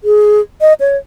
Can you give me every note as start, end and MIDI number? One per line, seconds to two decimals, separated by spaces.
0.04 0.41 68
0.61 0.73 75
0.80 0.97 73